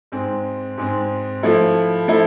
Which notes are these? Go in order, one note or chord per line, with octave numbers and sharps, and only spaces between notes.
G#2 G#3 C4
G#2 G#3 C4
F3 A3 E4 A4
F3 A3 E4 A4